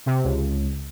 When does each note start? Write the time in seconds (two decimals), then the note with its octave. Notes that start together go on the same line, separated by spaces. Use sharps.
0.06 C3
0.24 C#2